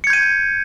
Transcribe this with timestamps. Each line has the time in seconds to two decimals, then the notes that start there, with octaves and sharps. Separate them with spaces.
0.04 C#7
0.07 G#6
0.10 G6
0.13 D#7